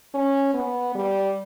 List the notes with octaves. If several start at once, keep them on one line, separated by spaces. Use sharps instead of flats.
C#4
B3
G3